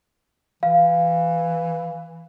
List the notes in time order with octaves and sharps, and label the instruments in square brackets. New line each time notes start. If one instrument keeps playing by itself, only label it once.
[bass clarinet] E3 [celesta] F5